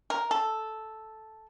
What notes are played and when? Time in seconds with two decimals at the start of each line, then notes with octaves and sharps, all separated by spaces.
0.10 A#4
0.31 A4